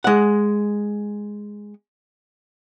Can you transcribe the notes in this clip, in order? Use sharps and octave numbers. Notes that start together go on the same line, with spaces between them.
G#3 F#5